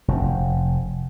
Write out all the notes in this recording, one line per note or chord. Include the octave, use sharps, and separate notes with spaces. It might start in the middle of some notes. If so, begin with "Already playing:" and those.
F1